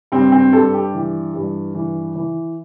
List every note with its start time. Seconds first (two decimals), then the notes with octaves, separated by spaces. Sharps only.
0.12 G2 C4
0.32 C4
0.53 G2 A4
0.73 G4
0.94 E3
1.34 G2
1.75 E3
2.15 E3